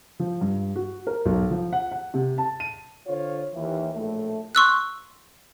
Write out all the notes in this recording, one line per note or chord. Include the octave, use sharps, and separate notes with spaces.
F3
G2
F#4
A#4
B1
F3
F#5
F#5
C3
A5
D#7
D3 F4 C5 C#5
D#2 E3
A#1 A2 A3
C6 C#6 E6 F#6